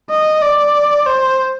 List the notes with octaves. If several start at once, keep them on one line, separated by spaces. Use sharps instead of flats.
D#5
D5
C5